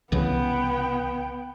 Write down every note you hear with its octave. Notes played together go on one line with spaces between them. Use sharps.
C2 C#3 E3 B3 G5